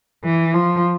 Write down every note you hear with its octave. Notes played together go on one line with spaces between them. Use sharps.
E3
F3